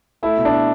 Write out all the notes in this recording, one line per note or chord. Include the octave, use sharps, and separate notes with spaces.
A3 E4
B2
D4